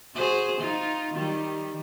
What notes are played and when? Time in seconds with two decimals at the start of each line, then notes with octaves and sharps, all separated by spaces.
0.14 F#4 G#4 C5
0.59 D#4 F4
1.14 D#3 G3